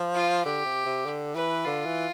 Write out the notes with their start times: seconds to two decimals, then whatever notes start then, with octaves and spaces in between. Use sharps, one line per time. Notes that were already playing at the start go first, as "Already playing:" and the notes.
Already playing: F3
0.15 F4
0.45 D3 G4
0.65 C3
0.86 C3
1.06 D3
1.35 E3 B4
1.65 D3 F4
1.86 E3